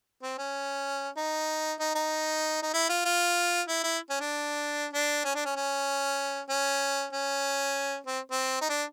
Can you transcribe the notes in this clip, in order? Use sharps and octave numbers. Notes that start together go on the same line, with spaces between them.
C4
C#4
D#4
D#4
D#4
D#4
E4
F4
F4
E4
E4
C#4
D4
D4
C#4
D4
C#4
C#4
C#4
C#4
C4
C4
D#4
D4